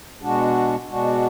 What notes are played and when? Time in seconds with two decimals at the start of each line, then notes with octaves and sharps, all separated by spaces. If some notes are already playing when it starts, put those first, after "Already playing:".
0.22 B2 G#3 D4 F#4
0.89 B2 G#3 D4 F#4